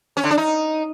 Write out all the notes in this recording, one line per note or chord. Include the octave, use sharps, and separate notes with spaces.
C#4
D3
D4
D#4